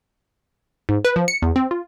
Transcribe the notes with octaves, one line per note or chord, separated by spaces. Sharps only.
G#2
B4
F3
C#7
E2
C4
F4